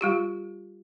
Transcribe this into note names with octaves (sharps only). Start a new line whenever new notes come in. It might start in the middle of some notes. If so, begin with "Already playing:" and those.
G3 F4 G4